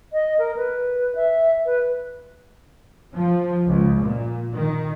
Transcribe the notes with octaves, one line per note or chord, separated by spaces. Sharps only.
D#5
A#4
B4
E5
B4
F3
C#2
A#2
D#3